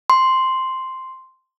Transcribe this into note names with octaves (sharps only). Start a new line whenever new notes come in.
C6